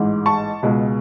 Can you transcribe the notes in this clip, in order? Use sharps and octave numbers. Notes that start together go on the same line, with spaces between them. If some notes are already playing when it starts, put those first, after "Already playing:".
Already playing: A1 G#2 G#3
A5 C#6
C#2 B2 G#3